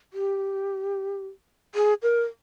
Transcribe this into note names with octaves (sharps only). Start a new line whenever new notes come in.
G4
G#4
A#4